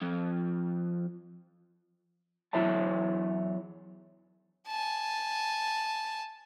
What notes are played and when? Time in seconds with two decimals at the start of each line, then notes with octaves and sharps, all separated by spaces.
0.02 F2
2.53 E2 F#3 E4 C#5 E5 A5
4.67 G#5 A5